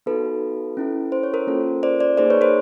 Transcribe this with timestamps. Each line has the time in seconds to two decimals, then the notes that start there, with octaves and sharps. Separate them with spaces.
0.06 B3 D#4 F#4 A4 B4
0.77 C#4 E4 A4
1.12 C5
1.23 C#5
1.34 A#4 C5
1.47 A#3 C#4 F4 A4
1.83 C5 D5
2.00 C5 D5
2.17 A#3 D#4 G#4 C5 D5
2.30 B4 C#5
2.41 A#4 C5